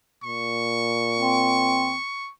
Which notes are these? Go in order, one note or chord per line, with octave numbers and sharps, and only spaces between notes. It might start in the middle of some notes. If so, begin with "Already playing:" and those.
A#2 C#6
C4